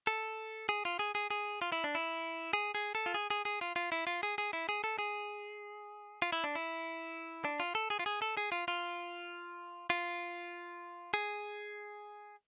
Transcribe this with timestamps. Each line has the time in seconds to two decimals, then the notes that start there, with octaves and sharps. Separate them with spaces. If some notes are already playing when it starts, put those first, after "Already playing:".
0.07 A4
0.69 G#4
0.85 F4
0.99 G#4
1.15 G#4
1.31 G#4
1.62 F4
1.72 E4
1.84 D4
1.95 E4
2.53 G#4
2.75 G#4
2.95 A4
3.06 F4
3.14 G#4
3.30 G#4
3.45 G#4
3.61 F4
3.76 F4
3.92 E4
4.07 F4
4.23 G#4
4.38 G#4
4.53 E4
4.69 G#4
4.84 A4
4.99 G#4
6.22 F4
6.32 E4
6.44 D4
6.55 E4
7.45 D4
7.60 F4
7.75 A4
7.90 G#4
7.99 F4
8.06 G#4
8.22 A4
8.37 G#4
8.52 F4
8.68 F4
9.90 F4
11.14 G#4